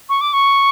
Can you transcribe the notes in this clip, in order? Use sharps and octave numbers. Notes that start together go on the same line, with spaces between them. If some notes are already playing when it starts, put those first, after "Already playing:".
C#6
D6
C#6